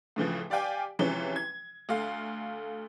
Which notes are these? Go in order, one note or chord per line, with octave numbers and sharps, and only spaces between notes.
A2 C#3 E3 F3
G4 D5 F5 G5 G#5
C3 E3 F3 G#3 C#4
G#6
D2 A3 F5